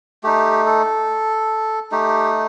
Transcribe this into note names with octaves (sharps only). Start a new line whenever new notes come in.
A3 D#4 G4
A4
A3 D#4 G4